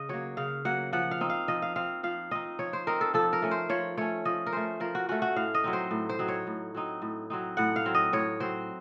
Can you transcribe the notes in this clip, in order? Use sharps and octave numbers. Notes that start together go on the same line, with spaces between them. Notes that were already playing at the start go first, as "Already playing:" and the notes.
Already playing: C#3 D#5
F#3 A#3 C#5
C#3 F5
F#3 A#3 F#5
F3 F#5
F5
C4 D#4
F5
F3 D#5
F5
C4 D#4 F5
F3 F5
C4 D#4 D#5
F3 C#5
C5
C4 D#4 A#4
A4
F3 A4
A#4
A3 C#4
C5
F3 C#5
A3 C#4 C#5
F3 D#5
A#4
A3 C#4 C5
F3 A#4
F#4
A3 C#4 F#4
F#4
A2 F5
D#5
F#3 C4 D#4
C5
A2
C5
F#3 C4 D#4
C#5
A2
F#3 C4 D#4
A2
F#3 C4 D#4
A2 F#5
F5
F#3 C4
D#5
A2 C#5
F#3 C4 C5